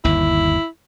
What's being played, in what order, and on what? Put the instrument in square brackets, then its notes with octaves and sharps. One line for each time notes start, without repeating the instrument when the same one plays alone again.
[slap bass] G1 D#2 [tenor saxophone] E4